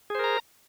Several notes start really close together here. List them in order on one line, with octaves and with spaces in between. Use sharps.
G#4 C5 A#4 A#5